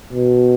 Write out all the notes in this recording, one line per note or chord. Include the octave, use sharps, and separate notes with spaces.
B2